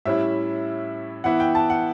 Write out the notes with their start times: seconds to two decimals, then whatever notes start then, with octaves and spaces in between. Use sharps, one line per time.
0.05 A2 G3 C#4 E4 E5
1.24 E3 B3 E4 F#5
1.40 G5
1.55 A5
1.70 F#5